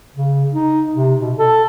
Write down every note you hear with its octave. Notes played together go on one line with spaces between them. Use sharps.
C#3
D#4
C3
B2
A4